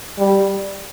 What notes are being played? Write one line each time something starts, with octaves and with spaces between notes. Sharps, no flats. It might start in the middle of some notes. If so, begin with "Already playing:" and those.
G3